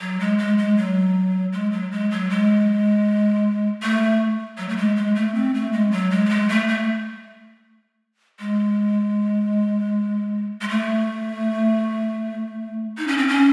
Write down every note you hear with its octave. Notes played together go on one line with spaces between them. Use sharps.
F#3
G#3
G#3
G#3
F#3
G#3
F#3
G#3
F#3
G#3
A3
F#3
A3
G#3
G#3
A3
C4
A3
G#3
F#3
G#3
A3
G#3
A3
A3
G#3
G#3
A3
D#4
C#4
C4
C#4